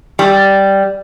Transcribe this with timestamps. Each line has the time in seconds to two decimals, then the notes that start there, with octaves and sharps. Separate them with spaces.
0.19 G3